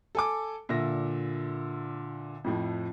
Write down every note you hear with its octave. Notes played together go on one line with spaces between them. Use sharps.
A4 G#5 D6
A#2 D3 E5 A#6
F2 A2 F3